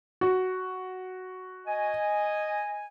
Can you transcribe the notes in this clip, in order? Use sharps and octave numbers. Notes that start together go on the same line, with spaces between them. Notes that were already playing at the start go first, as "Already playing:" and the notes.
F#4
D#5 G#5